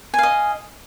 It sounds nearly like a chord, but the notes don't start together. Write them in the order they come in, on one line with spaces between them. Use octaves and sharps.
G#5 F5 D#5